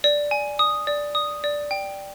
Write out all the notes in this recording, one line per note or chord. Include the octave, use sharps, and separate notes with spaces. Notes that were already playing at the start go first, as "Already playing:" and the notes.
D5
G#5
D#6
D5
D#6
D5
G5